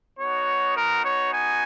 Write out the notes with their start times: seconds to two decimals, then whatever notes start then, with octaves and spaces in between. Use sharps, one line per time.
0.18 B3 D#4 F#4 C#5
0.75 A#4
1.04 C#5
1.33 G#5